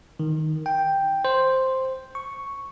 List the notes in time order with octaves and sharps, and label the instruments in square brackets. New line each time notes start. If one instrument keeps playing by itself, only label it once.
[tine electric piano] D#3
G5
C5
C#6